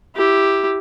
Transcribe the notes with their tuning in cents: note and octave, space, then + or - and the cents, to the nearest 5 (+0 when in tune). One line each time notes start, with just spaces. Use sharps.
E4 +0 G4 +0